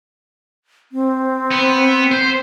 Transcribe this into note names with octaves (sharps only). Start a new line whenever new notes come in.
C4
B3
C5